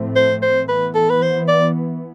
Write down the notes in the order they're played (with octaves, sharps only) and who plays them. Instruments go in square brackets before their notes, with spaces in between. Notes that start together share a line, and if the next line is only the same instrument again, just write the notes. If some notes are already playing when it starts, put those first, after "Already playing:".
Already playing: [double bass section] A2 F3 A3 C4
[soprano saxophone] C5
C5
[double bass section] E3 B3 [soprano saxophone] B4
[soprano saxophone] A4
B4
C5
D5